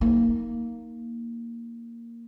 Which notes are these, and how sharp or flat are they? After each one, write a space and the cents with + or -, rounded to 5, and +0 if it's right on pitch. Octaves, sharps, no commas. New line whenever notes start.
A#3 +0 D#4 +15